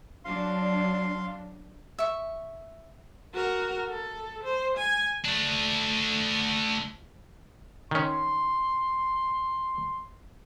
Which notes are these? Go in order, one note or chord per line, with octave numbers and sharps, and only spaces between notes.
F#3 D4 F5 C6
E5 C#6
F#4 A#4
A4
C5
G#5
A3 D4
D#3 C#4 C6